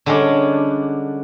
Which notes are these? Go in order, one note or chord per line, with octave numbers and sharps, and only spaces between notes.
D3 G3 G#3 C#4 D4